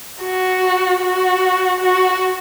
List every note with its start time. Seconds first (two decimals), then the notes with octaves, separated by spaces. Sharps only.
0.22 F#4
1.01 F#4
1.80 F#4